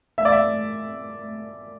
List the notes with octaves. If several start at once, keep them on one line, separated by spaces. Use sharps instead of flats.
E5
D5
E5